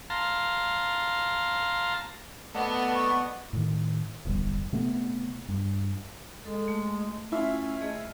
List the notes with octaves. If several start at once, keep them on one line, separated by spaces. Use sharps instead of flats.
F5 A5 A#5 C6
A3 B3 D5 D#5 F#5
C#6
A2 D#3
D1 G1 E2 G3
C3 A3 B3
G2
G#3 A4
A3
C#4 E4 F4 E5
A3 G#4 D#5